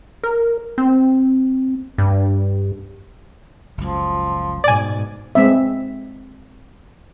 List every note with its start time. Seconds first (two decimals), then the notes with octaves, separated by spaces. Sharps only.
0.23 A#4
0.78 C4
1.98 G2
3.78 F#1 C#2 F3
4.64 G#2 B2 D5 G#5
5.35 G#3 C4 E5